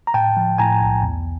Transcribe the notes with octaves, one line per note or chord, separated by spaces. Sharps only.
A#5
A2 G5 A5
F3
A2 G#5 A#5
B1
E2